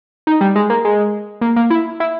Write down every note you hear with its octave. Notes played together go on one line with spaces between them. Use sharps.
D#4
G3
G#3
A#3
G#3
A#3
A#3
E4
E4